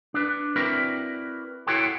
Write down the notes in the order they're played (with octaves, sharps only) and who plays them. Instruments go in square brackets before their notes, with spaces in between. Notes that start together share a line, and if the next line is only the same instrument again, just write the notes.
[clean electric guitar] D4 B4
C4 E4 F#4 A#4 B4 D5
E4 F#4 A4 C#5 G5 C6